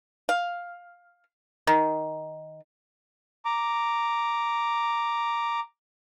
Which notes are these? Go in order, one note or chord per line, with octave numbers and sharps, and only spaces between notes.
F5
D#3
A#5 D6